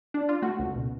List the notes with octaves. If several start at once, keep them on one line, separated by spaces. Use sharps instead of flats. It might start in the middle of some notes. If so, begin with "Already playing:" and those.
D4
F4
A3 F#4
C#2
B2